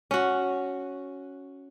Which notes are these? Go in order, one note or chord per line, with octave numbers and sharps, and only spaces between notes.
C#4 F#4